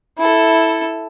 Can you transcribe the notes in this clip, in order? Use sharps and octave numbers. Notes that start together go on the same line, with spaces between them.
E4 A4